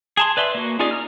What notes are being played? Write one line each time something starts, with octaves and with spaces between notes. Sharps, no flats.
G#4 A5 C6
B4 D5 E5 C6
A#3 F#4
C#4 D#4 F4 G#4 D5
A#5 F6